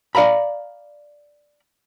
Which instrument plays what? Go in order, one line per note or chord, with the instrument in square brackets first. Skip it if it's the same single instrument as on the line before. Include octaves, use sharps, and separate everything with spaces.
[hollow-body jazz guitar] D5 F5 A#5 B5